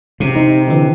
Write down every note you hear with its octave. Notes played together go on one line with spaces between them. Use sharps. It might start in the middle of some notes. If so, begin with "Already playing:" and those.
C3
D#4
D3 E3